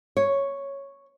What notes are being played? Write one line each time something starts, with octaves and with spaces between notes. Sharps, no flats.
C#5